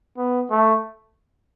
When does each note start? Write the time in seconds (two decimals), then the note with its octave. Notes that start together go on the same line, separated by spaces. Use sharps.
0.18 B3
0.51 A3